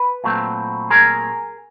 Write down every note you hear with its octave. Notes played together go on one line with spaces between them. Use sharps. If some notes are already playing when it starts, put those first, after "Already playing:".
Already playing: B4
A#2 F#3 A3 C4
G#4 A#4